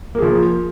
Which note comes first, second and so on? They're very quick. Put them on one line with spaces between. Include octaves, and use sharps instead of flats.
A#3 G#4 F3